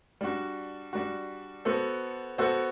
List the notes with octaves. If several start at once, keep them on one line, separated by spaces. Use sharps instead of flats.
G3 D4 F#4
G3 D4 F#4
B3 F#4 A4 C5
B3 F#4 A4 C5